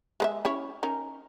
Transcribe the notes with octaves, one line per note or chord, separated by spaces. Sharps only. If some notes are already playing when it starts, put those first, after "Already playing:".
G#3 B4 E5
C#4 E4 C#5
C#4 D#4 A#4